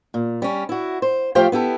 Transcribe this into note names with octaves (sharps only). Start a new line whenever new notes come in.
A#2
G3 C#4
E4 F#4
C5
F3 A3 G4 C5 F5 G5
B3 E4 G4 A4